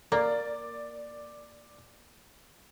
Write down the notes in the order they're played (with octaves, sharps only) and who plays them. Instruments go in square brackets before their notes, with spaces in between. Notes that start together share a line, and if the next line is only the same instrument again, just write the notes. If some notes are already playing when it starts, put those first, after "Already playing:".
[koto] A#3 [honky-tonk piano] D5